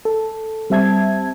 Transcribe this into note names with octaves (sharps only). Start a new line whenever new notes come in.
A4
G3 C4 E5 A5 G#6